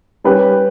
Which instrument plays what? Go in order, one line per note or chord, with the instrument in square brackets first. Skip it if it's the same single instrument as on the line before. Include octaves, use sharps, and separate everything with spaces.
[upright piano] G3 C#4 G4 B4